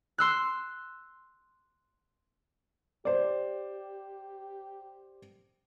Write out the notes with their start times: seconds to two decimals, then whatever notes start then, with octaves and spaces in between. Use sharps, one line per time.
0.18 C6 E6 F#6
3.05 G4 C5 D5